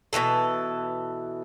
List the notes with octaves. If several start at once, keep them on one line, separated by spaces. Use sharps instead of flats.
B2 D#3 E3 A4